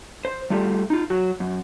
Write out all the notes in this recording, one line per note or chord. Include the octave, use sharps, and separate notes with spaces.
C5
G3 A3 F4 G4
D#4 F4
F#3 F#4
F#2